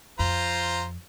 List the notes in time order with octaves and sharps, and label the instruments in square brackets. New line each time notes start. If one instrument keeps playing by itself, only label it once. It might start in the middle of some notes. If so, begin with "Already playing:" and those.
[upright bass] F2 [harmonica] F4 C5 A#5